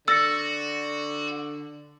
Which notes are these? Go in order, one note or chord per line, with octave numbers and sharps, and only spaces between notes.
D3 F#4 E6 A6 A#6 C#7